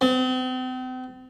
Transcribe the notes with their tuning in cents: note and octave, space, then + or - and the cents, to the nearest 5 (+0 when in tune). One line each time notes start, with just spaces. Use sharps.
C4 -40